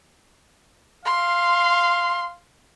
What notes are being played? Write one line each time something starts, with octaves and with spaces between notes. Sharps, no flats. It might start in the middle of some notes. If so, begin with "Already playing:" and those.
F5 C6